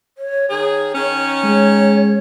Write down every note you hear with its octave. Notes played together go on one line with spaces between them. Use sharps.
C#5
D#3 G#4 C#5
D#3 C#4
G#3 C#5